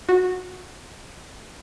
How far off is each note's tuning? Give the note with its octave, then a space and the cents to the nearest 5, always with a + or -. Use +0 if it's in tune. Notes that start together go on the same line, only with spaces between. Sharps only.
F#4 -15